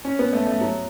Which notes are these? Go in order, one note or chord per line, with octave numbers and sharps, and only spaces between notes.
C#4
B3
A3
A3
F#3